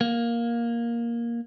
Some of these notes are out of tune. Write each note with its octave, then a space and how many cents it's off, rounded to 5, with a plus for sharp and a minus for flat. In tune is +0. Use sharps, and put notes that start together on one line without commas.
A#3 +10